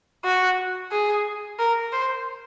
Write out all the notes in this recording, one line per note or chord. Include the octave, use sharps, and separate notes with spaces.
F#4
G#4
A#4
C5